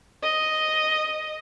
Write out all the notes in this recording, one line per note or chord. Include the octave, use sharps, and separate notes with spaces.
D#5